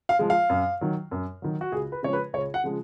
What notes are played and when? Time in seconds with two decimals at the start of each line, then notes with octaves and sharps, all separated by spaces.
0.09 F5
0.19 F3 G#3
0.30 F5
0.50 F#2
0.81 D#3 F#3
1.11 F#2
1.42 D#3 F#3
1.61 F#4
1.72 C#2 G#4
1.92 B4
2.03 C#3 F3 G#3 C#5
2.13 B4
2.33 C#2 C#5
2.54 F#5
2.64 C#3 F3 G#3